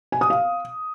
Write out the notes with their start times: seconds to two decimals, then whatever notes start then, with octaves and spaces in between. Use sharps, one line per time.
0.12 G#5
0.21 D#6
0.30 F5